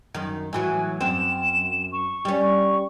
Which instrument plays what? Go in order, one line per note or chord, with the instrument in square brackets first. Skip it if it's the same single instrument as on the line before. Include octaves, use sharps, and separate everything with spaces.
[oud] F#2 D#3
[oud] A2 E3 F#3 [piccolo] G#5
[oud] F#2 C4 [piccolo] E7
[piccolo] C#6
[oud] G3 C#4
[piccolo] C#6